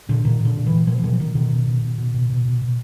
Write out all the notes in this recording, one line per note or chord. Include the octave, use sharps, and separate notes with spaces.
A#2 D3
A#2 D#3
A#2 D3
A#2
E3
A#2
B2 F3
E3
B2 F3
B2 D#3
B2 D#3
B2
B2
B2
B2
B2
B2
B2
B2